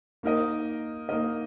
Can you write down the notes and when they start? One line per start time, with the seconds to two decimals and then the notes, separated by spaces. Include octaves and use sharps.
0.23 A#3 D#4 A#4 D#5
1.09 A#3 D#4 A#4 D#5